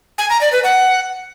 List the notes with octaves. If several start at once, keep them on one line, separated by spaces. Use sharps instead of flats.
G#5
A#5
D5
B4
F#5